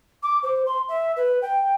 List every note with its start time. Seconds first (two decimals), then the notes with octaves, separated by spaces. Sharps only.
0.22 D6
0.43 C5
0.66 C6
0.88 E5
1.16 B4
1.42 G5